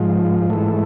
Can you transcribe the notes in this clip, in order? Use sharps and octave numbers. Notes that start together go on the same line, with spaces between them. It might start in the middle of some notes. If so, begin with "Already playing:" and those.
Already playing: G#2 F3
G#2 E3 A3